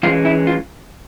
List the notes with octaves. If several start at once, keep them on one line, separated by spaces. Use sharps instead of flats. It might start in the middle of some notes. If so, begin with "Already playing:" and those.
E3 G#3 C#4 F4
E4
F4